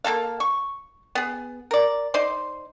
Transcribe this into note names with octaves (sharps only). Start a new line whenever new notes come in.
A#3 C4 A4 F5
C#6
B3 G#4
A#4 D5
D#4 C5 D5 C6